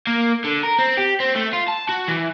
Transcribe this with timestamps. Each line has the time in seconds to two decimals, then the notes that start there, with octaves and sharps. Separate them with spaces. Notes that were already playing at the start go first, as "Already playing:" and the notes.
0.07 A#3
0.44 D3
0.63 A#4
0.79 C4
0.98 G4
1.20 C4
1.35 A3
1.53 F4
1.68 A5
1.89 F#4
2.08 E3